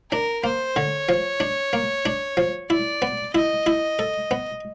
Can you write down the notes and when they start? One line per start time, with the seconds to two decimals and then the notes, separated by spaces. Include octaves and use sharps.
0.11 D4 A#4
0.44 A#3 C5
0.76 D3 C#5
1.09 F3
1.40 D4
1.73 A#3
2.06 D4
2.37 F3
2.70 E4 D5
3.02 B3
3.35 E4 D#5
3.66 E4
3.99 A4
4.31 B3